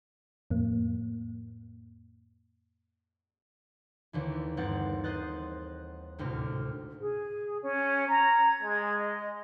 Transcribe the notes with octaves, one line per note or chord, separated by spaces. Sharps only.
F2 A2 A#3
D#2 D3 E3
G1 C4 F#5 A6
C5 D#5 F#6 A6
G#1 D2 A2 C3 F6
G#4
C#4
A#5 G#6
G#3
D#5